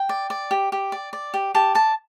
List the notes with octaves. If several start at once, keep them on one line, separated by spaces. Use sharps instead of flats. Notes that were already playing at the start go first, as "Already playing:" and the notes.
Already playing: G5
D5
D5
G4
G4
D5
D5
G4
G4 A5
D5 A5